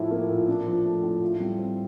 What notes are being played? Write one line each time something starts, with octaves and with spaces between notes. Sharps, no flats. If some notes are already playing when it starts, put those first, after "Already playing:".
Already playing: A2 F3 E4
A#3
A#2
D4
F3
A3
A2
F4
G3
C4